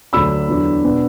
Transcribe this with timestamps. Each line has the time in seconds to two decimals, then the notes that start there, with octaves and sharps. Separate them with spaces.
0.13 D2 D3 F#3 D4 B5 E6
0.48 E2 D3 F#3 D4
0.84 B2 B3 D4